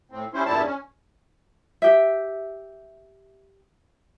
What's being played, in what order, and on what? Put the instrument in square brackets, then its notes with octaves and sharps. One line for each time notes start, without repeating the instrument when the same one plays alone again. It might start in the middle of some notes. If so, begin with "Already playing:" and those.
[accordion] A2 C4
G3 C#4 E4 C5
E2 G2 A#2 G3 E4 A5
C#4
[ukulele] G4 E5